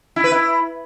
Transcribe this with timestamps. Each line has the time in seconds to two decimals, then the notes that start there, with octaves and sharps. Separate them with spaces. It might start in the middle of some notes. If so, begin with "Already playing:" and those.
0.16 E4
0.24 B4
0.32 E4